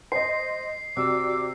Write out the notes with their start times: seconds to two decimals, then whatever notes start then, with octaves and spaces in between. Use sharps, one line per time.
0.12 C5 D#5 C7
0.97 C3 F#4 D5 D6 E6